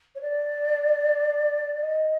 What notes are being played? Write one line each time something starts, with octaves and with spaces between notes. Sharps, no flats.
C#5
D5
D#5